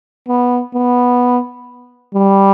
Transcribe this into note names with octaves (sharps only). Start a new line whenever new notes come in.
B3
B3
G3